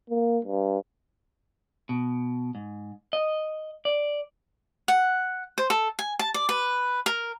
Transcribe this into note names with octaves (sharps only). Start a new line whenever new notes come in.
A#3
G2
B2
G#2
D#5
D5
F#5
C5
A4
G#5
A5
D5
B4
A#4